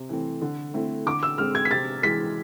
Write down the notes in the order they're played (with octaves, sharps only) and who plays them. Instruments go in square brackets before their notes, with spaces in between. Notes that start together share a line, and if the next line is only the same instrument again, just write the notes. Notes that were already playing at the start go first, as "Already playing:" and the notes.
Already playing: [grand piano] C3
E3 A3 C4
D3
A3 C4 E4
[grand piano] D3 [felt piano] D6
[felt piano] E6
[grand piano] G#3 C4 [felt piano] F6
[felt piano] G#6
B6
[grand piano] C3 [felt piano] A6
[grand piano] E3 G#3 [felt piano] B6